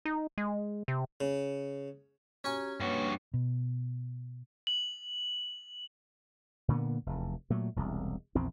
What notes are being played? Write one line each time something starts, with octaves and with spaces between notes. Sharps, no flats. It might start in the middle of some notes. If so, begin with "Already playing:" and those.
D#4
G#3
C3
C#3
C#4 F#4 G4 G#5 A#5 C#6
G2 A#3 F#4 B4 C#5
B2
F#7
A#2 D3 A#3 B3
F1 E2
A#2 F#3 A3
E1 C2
A#1 E2 C4